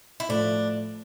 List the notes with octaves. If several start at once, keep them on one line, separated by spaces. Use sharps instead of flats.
E4
A2 F3 A3 D4